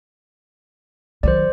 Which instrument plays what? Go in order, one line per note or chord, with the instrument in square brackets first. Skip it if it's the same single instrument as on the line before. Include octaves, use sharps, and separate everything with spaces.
[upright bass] D#3 F#3 [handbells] C5 D5